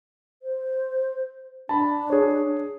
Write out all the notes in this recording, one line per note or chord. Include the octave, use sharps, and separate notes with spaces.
C5
D4 A5 B5
G#4 C#5